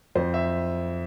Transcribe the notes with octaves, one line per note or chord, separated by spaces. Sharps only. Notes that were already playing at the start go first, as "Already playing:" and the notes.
F2 C5
E5